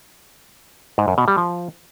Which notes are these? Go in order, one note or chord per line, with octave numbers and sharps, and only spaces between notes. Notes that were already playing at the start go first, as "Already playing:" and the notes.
G#2
F#2
B2
G3
F3